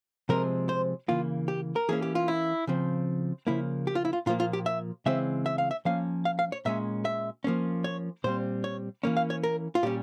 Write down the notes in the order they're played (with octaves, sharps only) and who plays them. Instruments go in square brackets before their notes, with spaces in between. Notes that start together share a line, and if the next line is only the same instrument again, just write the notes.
[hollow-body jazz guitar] C3 F3 G#3 C4 A#4
C5
C#3 E3 A#3 F4
G4
A#4
E3 A#3 C#4 G#4
G4
F4
E4
C#3 F3 C4
C#3 F3 A#3 E4
G4
F4
E4
F4
A#2 F3 A#3 F4
F4
G4
E5
C#3 E3 G#3 C4 E5
E5
F5
E5
F3 A#3 C#4 F5
F5
F5
C#5
A#2 G#3 C#4 E5
E5
F3 A#3 C#4
C#5
A#2 G3 C4 C5
C#5
E3 A#3 C#4
F5
C#5
A#4
F4
A#2 G3 C#4 G4